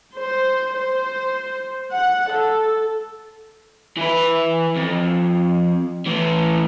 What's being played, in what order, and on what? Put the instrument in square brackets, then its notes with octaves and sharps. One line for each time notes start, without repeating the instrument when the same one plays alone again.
[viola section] C5
C5
F#5
A4
[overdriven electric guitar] E3 B4
F2
A2 E3